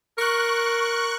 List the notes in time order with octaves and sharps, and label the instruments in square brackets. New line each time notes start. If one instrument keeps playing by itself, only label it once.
[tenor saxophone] A#4 [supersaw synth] C#6 F#6